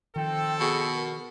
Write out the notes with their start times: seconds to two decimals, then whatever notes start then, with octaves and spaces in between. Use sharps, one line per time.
0.16 D#3 F3 C4 A4 G5
0.60 B2 G#4
0.94 A#4